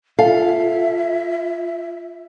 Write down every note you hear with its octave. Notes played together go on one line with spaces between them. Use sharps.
F4 A4 E5 F5